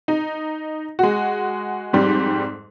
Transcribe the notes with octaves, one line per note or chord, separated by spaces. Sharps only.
D#4
G#3 F#4
F2 G#2 G3